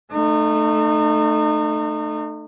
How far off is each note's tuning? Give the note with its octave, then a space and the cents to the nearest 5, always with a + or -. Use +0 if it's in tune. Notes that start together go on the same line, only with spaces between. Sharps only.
A3 +5 D#4 -35